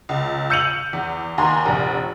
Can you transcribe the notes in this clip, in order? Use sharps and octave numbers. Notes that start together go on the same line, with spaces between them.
C#2
E6 G6 C#7 D#7 F7 F#7
E2
D#2 G#5 A#5 C6
F1 A#1